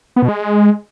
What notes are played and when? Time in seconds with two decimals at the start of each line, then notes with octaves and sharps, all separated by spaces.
0.16 B3
0.22 B2
0.28 G#3